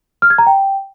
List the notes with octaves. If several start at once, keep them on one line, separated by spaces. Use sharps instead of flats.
F6
G#6
A#5
G5